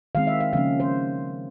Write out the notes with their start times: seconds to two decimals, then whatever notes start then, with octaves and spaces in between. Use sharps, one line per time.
0.15 D#3 G#3 C4 F5
0.27 E5
0.40 F5
0.53 C#3 F3 A#3 C#4 F5
0.80 C5